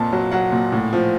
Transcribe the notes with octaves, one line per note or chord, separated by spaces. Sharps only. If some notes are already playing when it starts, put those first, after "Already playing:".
Already playing: F2 A#2 A5
F#3
F#3 F#5
A#2
A2
F3